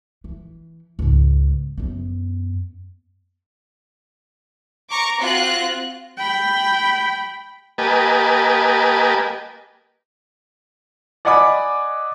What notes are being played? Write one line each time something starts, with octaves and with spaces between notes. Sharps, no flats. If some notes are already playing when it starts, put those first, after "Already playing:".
E3
C#2 G#2
F#2 B3
A#5 C#6 D6
C4 F4 F#4 F#6
G5 B5
A#3 G4 B4 D#5 G#5 A5
D5 D#5 F#5 G#5 B5 D6